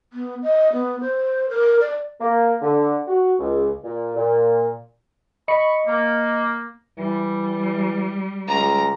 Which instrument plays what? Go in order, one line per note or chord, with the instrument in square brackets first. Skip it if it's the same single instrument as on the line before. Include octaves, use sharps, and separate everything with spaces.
[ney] B3
D#5
B3
C5
A#4
D5
[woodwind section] A#3
D3
F#4
C#2
A#2
A#2
[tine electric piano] D#5 C#7 [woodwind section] B5 C#6
[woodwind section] A#3
[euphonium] E3 [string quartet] G3
[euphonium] C#2 [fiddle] A#5